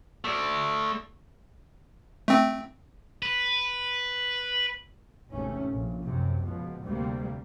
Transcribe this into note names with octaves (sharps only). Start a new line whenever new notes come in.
A3 D5
A3 C4
B4
G#1 E2 C3 A3 C#4
A#1
F#2 C3
C#2 B2 F3
D2 C3 G3 A#3